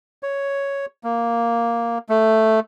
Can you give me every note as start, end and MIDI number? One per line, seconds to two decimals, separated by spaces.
0.23 0.86 73
1.04 1.98 58
2.09 2.60 57